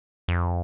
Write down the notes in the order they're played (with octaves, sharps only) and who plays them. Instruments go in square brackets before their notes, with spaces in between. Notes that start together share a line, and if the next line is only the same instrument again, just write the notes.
[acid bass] F2